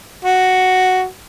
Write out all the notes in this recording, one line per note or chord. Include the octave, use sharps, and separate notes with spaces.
F#4